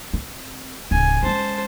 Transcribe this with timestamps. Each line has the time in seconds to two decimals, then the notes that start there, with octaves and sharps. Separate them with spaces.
0.13 C4
0.91 D1 C#3 G#5
1.23 G#3 C#4 C5 A5